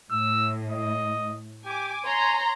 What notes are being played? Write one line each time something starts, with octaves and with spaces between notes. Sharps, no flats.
A2 E6
D#5
G4 G#5 D6
C#5 G#5 A#5 C6